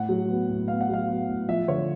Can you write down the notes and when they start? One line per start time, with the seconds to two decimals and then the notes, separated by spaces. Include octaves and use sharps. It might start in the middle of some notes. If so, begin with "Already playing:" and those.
Already playing: A2 F#5
0.09 F#3
0.29 B3
0.49 A2
0.68 B3 F5
0.81 F#5
0.89 F#3 F5
1.08 B3
1.29 A2
1.49 F3 E5
1.68 D3 C#5